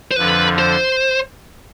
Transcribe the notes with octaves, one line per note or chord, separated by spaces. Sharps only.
C5
F2 D3 F3 B4
C5